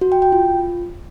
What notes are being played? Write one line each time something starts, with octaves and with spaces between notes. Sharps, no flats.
F#4
G5
G5
F4